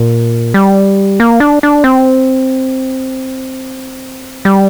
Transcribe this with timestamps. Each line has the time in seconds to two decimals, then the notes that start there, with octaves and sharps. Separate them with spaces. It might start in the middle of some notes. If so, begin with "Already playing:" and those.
Already playing: A#2
0.54 G3
1.20 A#3
1.40 D4
1.63 D4
1.84 C4
4.45 G3